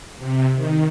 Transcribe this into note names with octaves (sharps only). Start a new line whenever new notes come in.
C3
D#3